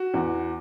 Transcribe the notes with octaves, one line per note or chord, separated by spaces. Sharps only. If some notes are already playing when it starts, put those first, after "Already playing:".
Already playing: F#4
E2